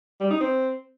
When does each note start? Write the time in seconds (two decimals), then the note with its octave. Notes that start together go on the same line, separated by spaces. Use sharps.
0.20 G3
0.30 D#4
0.40 C4